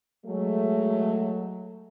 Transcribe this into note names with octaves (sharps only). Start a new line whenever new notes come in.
F#3 G#3 A3